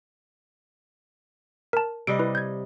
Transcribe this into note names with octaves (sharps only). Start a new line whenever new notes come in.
A#4 A5
C3 G3 D#5 D7
E4 B4
G6 G#6